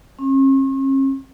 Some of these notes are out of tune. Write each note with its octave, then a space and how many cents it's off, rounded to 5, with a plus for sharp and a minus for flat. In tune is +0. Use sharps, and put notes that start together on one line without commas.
C#4 -45